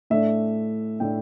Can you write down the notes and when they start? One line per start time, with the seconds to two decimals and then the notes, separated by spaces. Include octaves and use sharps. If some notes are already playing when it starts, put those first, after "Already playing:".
0.10 A2 A3 D4 E5
1.00 A2 A3 D4 G5